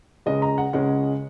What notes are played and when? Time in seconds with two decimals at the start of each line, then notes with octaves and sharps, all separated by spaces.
0.26 C#2 C#3 G#3 C#4 D#5
0.42 A#5
0.58 F#5
0.73 C#2 C#3 G#3 C#4 F#5